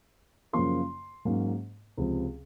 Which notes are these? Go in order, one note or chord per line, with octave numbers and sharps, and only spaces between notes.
F#2 C#3 F3 A#3 C6
G#2 F#3 A#3 C#4
C#2 C3 F3